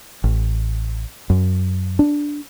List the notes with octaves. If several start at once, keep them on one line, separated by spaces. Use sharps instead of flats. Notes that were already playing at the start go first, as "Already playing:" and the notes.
A1
F#2
D4